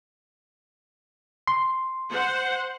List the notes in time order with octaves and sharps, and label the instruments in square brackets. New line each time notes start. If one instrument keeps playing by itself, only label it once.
[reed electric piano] C6
[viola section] C5 F#5